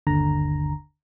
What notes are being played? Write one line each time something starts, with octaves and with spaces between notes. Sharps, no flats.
G1 D#2 D3 A#5